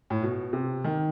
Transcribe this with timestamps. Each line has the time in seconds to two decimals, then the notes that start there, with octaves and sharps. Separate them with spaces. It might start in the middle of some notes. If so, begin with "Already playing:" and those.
0.10 A2
0.22 B2
0.53 C3
0.84 D#3